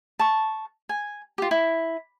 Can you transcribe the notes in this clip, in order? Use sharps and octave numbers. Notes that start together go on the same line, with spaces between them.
A5 C#6
G#5
F4 G4
E4